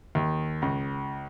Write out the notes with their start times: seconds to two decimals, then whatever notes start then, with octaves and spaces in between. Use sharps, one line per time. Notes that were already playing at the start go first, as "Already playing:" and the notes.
0.15 D#2
0.62 C#2